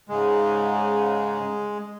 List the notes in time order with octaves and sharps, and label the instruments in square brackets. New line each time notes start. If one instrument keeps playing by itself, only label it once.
[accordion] G#2 C#3 [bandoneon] G#3